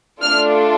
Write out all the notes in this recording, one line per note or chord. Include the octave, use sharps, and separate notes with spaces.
A3 D4 F4 A4 F6